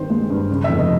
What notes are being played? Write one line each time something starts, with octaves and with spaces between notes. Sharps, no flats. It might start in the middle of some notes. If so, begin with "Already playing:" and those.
Already playing: G2 D#3 C4 C5
G#3
G2
C#3
F1 E5
D#5